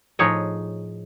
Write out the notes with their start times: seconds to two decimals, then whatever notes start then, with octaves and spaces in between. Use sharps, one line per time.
0.19 A2 F3 D#4 G#4 C#5 D#5